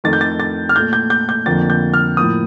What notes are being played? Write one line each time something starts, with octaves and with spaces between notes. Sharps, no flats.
F2 D#3 A3 A6
G6
A6
A6
F6
A#2 A3 G6
G6
G6
G6
F2 D3 F3 A#3 A6
G6
F6
A2 F3 A#3 D#6